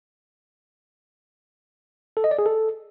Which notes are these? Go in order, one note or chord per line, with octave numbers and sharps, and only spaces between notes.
A4
D#5
D5
G#4
A4